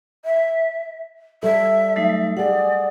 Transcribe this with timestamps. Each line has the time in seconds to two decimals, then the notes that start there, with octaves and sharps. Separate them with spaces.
0.25 E5
1.43 G3 A4 E5
1.96 F#3 A3 D#4
2.37 G4 G#4 D5 F#5